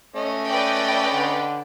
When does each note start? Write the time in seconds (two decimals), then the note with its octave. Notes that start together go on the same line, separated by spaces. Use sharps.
0.16 A3 C#4 D#5
0.48 B4 D5 G5
1.13 D3